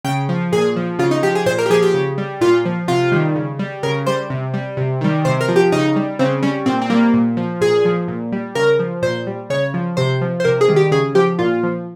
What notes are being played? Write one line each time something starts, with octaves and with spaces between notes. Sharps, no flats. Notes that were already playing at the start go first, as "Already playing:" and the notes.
C#3 G5
F3
A#2 G#4
F3
C#3 F4
D#4
F3 G4
G#4
A#2 C5
A#4
G4
F3 G#4
G4
C#3
G3
A#2 F4
F3
C3 F4
D#3 G3
C#3
G3
C#3 A#4
G3 C5
C3
G3
C3
D#3 G3
C3 C5
A#4
F3
G4
C#3 D#4
G3
C#3 C4
G3 C#4
A#2 C4
C4
G3 A#3
A#2
F3
A#2 G#4
F3
A#2
G3
C#3 A#4
F3
A#2 C5
G3
C#3 C#5
F3
C3 C5
F3
C5
C3 A#4
G#4
D#3 G3
G4
C#3 G#4
F3 G4
A#2 F4
F3